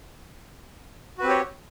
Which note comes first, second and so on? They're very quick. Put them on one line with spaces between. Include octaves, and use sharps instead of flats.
F#4 B4 C4 G4 C#5